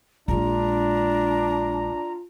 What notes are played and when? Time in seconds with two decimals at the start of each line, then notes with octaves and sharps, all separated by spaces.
0.28 A#1 G#3 D4 F4 A#5